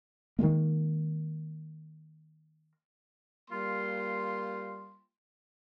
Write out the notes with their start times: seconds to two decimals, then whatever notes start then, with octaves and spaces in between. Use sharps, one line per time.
0.39 D#3 F#3 G#3 A#3
3.50 G3 A#3 F4 C6